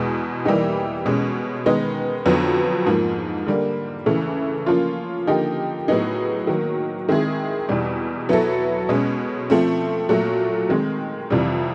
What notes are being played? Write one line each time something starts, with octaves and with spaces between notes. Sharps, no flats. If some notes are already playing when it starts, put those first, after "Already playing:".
Already playing: E2 B2 G#3
E3 G3 A#3 D#4 G4
B2 G#3 C#4
D#3 G#3 B3 D#4
F2 D3 F#3 B3
G#2 F3 A#3
D3 G3 A#3
C#3 E3 A3
F3 A#3 C#4 F4
D3 F3 A#3 D#4 G4
A2 F#3 B3 D#4 G#4
D#3 F#3 A#3
D#3 G#3 C4 E4 G#4
E2 B2 G3
F#3 B3 E4 A4
B2 G#3 C#4
F3 A3 C4
A#2 F#3 A3
D#3 G#3 C4
F2 C3 E3 G3